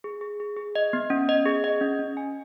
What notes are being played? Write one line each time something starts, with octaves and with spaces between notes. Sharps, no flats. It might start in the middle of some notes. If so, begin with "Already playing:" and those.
G#4
G#4
G#4
G#4
D#5
B3
C#4
D#5
G#4
D#5
C#4
C#4
G#5